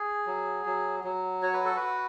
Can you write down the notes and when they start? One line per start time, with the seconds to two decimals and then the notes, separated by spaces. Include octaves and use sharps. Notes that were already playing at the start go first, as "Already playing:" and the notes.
Already playing: G#4
0.26 F#3
0.66 F#3
1.04 F#3
1.42 F#4 C#5
1.53 B4
1.65 A4
1.76 F#4 B4